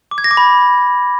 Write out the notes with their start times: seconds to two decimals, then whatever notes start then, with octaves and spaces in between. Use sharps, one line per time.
0.11 D6
0.18 G#6
0.24 A#6
0.31 D6
0.37 B5